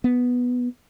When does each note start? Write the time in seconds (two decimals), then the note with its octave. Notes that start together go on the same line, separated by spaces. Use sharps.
0.04 B3